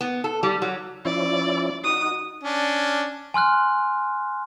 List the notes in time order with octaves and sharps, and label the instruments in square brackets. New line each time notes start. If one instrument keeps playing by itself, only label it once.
[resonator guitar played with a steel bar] B3
A4
G3
F#3
[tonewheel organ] F3 C#4 E4 [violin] D5
[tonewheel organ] D#4 F#4 [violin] D#6
[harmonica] C#4 D4
[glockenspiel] G#5 C6 F6 F#6